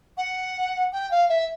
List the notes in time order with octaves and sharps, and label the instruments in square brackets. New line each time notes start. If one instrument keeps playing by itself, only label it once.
[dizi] F#5
G5
F5
E5